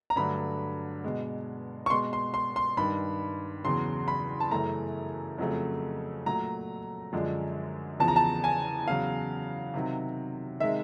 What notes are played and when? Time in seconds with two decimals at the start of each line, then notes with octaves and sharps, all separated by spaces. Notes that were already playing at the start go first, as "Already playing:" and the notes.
0.10 A#5
0.16 G2 D3 F#3 A3 B5
1.04 B2 G#3
1.86 C#6
1.90 B2 G#3 C6
2.13 C6
2.34 C6
2.56 C6
2.77 G2 D#3 G3 B5
3.65 E2 C#3 F#3 C6
4.08 B5
4.40 A5
4.51 F#2 C#3 E3 A3 A#5
5.38 F2 C#3 F#3 A3
6.26 A#2 F#3 A3 A#5
7.13 F#2 D3 F3 G#3
8.00 E2 C#3 F3 A5
8.08 A#5
8.16 A5
8.44 G#5
8.86 E2 C#3 F#3 F5
9.74 C3 D#3 F#3
10.60 C3 D#3 G#3 E5